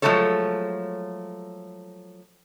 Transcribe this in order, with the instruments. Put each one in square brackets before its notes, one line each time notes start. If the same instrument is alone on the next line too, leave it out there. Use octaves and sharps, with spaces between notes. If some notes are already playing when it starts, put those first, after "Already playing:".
[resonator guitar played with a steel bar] F3 F#3 G#3 A3 A4 C#5